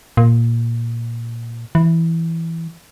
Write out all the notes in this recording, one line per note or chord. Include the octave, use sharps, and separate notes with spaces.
A#2
E3